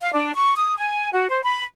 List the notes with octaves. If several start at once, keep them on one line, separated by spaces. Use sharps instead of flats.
F5
D4
C#6
D#6
G#5
F#4
C5
B5